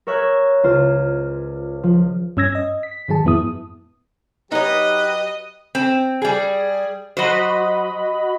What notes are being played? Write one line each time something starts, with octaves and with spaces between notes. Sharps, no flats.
A#4 C#5 E5 F#6 G#6
C#2 F4 C5
F3
G2 C#4 E6 G#6 A#6
D#5
B6
G#2 D#3 F#3 G#4 A5
F2 G#2 B3 E4 D#6
F#3 D#4 G4 B4 C#5 D#5
C4
G3 G#4
F#3 F#4 C5 D#5 B5